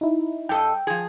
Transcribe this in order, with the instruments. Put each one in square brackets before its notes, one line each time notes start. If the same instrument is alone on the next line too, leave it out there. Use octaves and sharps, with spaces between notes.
[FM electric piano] D#4 E4
[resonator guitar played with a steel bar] G2 A4 D#5 [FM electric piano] G5
[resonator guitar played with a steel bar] F3 G#4